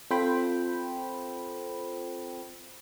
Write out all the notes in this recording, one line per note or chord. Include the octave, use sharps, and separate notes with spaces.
C4 F4 A4 C5 G5 B5